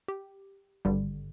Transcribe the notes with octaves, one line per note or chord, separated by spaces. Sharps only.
G4
G#1 G2 D3 G3